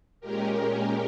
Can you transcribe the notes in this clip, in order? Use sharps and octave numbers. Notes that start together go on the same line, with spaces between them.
A#2 G#3 C#4 G4 A#4
G4 A#4